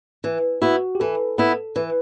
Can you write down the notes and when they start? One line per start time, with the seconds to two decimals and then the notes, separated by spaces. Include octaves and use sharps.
0.24 E3
0.62 B3 E4 F#4
0.95 G4
1.00 E3 A4
1.38 B3 E4
1.76 E3 B4